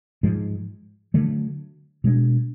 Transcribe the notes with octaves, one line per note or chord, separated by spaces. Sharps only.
G#2 F3 G#3
D3 F#3 A3
B2 G#3 B3 D4